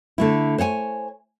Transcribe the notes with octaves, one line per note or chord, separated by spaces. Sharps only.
D3 A3 E4
C5 C#5 F#5 G#5